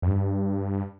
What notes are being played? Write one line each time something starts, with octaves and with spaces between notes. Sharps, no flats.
F2
G2